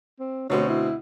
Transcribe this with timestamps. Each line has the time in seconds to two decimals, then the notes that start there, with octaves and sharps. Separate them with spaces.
0.20 C4
0.50 D2 B2 C4 C#5
0.69 E4